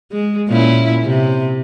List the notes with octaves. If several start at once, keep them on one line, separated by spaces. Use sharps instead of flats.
G#3
A#2 C#4 E4
C3